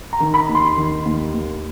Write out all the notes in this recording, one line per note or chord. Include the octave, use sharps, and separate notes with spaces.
A#5
D#3
B5
D#2
C6
D#3
D#2
D#2